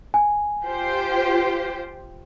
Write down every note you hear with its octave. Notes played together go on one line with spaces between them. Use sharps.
G#5
F4 G4 C5